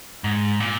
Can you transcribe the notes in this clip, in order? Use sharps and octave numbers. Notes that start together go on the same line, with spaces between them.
G#2
A#2